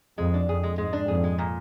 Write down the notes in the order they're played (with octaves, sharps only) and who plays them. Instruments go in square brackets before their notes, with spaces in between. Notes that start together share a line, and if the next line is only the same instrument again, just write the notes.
[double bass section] F2 [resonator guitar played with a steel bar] G#3
[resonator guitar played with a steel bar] D4
[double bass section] F2 [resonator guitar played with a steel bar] G#4
[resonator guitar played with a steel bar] G#3
[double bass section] G#2 [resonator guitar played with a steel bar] G#3
[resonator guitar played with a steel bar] D4
[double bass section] F2 [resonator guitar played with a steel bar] G#4
[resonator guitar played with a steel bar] G#3
A#2